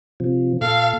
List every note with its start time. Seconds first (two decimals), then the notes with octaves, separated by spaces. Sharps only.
0.20 C3 F3
0.61 A#2 A4 F5